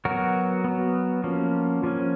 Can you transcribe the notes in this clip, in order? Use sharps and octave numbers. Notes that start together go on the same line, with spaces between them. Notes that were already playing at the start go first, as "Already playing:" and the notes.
F#3 B3 F#4 A#4
F#3 B3
F3 A#3 C#4
F3 A#3 C#4